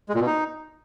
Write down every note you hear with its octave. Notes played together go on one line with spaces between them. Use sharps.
G#3
A#2
B2
D#4